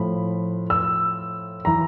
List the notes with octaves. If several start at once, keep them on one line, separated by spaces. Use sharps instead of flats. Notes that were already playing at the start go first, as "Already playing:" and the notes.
Already playing: A2 F3 B5
E6
E3 A#5